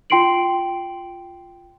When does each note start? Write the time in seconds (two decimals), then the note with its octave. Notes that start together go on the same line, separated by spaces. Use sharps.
0.10 F4 G5 C6 C7 D7 F#7